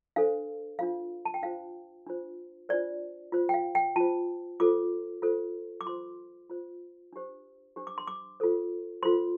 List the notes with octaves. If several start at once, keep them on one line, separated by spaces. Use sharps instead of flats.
D4 A4 C5 F5
D4 F4 C5 F5
A5
G5
D4 F4 C5 F5
D4 F4 C5
D4 F4 C5 D5
F4 C5
G5
F5
G5
F4 C5 A5
F4 A4 C5 D6
F4 A4 C5
D6
F4 C5 C6
F4 C5
D4 G4 C5
D4 G4 C5
D6
C6
D6
F4 A4 C5
F4 A4 C5 C6